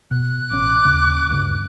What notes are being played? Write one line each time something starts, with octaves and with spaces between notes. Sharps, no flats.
B2 F#6
A1 C#4 D6
D#2 C#3
D2 G2 C#3